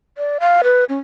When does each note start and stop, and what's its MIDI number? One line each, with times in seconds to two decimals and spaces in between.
0.18 0.38 74
0.40 0.62 77
0.64 0.84 71
0.89 1.00 61